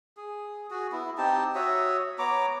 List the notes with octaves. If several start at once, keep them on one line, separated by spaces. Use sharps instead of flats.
G#4
F#4 G#4
B3 E4
C4 D#4 G4 A5
F#4 C#5 E5 D#6
B3 C#5 A#5 D6